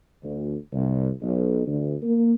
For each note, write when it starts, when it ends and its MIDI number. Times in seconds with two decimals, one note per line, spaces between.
0.23 0.54 38
0.73 1.09 36
1.21 1.65 35
1.66 1.94 38
2.03 2.33 58